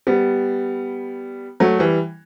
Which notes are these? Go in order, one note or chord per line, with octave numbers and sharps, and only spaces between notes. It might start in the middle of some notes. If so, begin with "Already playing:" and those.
G3 B3
F#3 A3
E3 G3